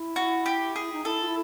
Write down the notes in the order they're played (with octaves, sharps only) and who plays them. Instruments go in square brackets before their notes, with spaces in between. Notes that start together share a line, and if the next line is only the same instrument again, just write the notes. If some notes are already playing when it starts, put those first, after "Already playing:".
Already playing: [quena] E4
[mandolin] F#4
G4
G#4
[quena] D#4
[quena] E4 [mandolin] A4
[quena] F4
E4